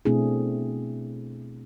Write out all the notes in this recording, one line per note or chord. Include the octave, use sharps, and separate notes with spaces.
B2 A3 C4 D4 E4 G#4